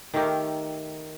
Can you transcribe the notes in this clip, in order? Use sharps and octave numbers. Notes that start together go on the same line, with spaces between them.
D#3 A3 G4 A#4